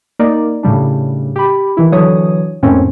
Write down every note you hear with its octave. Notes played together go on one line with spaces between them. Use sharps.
A#3 D#4 A#4 D5
A2 C#3 G3 D4
G4 B5
D#3 E3 E4
D3 E3 F#3 C#5 D#6
F2 A2 D#3 A#3 C4 C#4